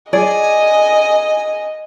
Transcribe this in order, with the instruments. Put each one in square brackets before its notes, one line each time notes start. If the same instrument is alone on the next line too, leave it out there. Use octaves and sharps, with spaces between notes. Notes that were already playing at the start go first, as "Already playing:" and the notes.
[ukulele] G#4 D5 [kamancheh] D#5 [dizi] G#5